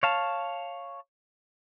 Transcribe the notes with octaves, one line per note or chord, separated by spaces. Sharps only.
C#5 F5 A5